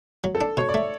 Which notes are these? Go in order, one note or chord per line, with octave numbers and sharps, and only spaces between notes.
F#3
A4
D4
B2 C#5
D5
A3